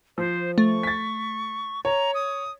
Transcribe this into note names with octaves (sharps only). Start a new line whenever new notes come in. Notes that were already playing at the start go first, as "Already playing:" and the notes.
F3 C5
A3 C#6
A6 B6
C#5 A#5
D#6